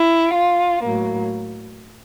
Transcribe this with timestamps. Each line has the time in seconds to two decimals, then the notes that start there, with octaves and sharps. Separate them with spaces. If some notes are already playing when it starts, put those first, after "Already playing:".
Already playing: E4
0.34 F4
0.83 A2 F#3 A#3